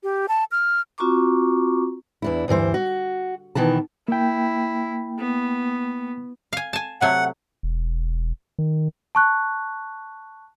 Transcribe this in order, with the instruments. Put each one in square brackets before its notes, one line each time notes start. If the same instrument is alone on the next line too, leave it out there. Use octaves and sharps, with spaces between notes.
[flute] G4
A5
F6
[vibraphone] C4 F4 F#4 A#5 C#6 D6
[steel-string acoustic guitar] E2 D4 E4
D2 G2 E3 C5
F#4
B2 D#3 E3 B3 A5
[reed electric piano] A#3 G5 [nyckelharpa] E4
[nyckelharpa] B3
[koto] F5 G#5
G#5 A5
[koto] C3 F#3 A3 [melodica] F#5
[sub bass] E1
D#3
[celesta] A5 C#6 F#6